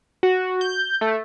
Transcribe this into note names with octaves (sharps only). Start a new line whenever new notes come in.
F#4
G6
A3